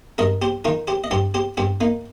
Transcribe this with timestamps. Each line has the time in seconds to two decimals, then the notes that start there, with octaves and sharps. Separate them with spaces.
0.18 G2 A#4 D#5
0.42 G4 C5
0.65 D#3 F4 A#4
0.88 G4 C5
1.04 D#5
1.11 G2 G4 C5
1.34 G4 C5
1.57 G2 G4 C5
1.81 A#3 D#4